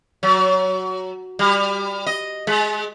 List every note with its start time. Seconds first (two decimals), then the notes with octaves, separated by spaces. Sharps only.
0.23 F#3
1.39 G3
2.06 D#5
2.47 G#3